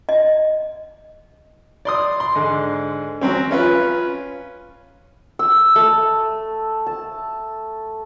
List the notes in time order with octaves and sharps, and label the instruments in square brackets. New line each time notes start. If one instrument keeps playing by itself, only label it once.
[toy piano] D#5
[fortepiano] D5 C6 D#6
C6
G#2 D3
F#3 C4 C#4
C#4 F4 B4
[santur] E6
A3
A5